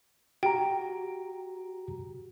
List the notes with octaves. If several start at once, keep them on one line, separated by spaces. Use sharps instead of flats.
F#4 G4 G5 A#5